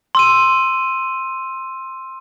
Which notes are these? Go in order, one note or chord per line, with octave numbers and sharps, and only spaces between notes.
C6 E6 D#7